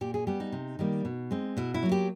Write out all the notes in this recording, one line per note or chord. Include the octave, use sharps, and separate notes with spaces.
A#2 G4
G#4
G3 B3 G4
D#4
C3
D#3 G3 A#3
B2
G#3 C4
B2 E4
E4
F#3 A#3
G4